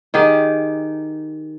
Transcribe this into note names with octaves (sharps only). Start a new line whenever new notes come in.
D#3 G4 G#4